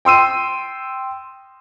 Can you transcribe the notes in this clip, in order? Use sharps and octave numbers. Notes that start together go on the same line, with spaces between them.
G5 C6 E6 D#7